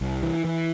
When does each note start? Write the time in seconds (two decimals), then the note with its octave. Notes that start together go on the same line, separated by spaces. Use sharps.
0.01 C2
0.23 E3
0.45 E3